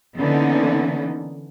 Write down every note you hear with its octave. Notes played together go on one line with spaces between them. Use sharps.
D3 E3 A#3 B3 C#4 D#4